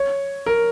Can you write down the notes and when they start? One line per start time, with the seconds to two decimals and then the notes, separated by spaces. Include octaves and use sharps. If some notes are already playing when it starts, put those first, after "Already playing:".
Already playing: C#5
0.46 A#4